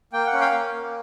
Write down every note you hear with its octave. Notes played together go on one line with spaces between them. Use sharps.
A#3 G5
F#5
C#4
F5 G5
A#3
A#3